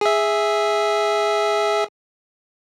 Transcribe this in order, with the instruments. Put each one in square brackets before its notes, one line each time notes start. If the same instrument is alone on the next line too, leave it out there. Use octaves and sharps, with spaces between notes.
[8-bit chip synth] G#4 E5